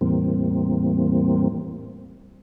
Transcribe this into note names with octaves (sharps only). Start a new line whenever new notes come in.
E2 A2 E3 G3 A#3 C4